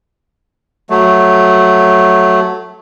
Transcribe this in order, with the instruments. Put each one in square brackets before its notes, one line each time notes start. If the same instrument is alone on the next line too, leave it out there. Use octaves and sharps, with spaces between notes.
[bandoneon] F#3 A3